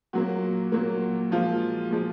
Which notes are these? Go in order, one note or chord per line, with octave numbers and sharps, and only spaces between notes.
A#2 F#3 A#3 F#4
A#2 F#3 A#3
A#2 F3 G#3 F4
A#2 F3 G#3